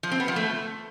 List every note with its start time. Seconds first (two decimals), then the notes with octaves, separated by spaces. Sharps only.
0.03 F3
0.11 C4
0.20 B3
0.28 F3
0.36 A3